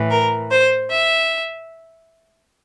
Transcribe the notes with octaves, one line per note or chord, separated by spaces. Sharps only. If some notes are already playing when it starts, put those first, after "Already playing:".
Already playing: A2 E3
A#4
C5
E5